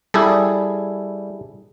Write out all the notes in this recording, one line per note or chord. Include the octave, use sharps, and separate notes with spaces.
G3 E4 G#4 A4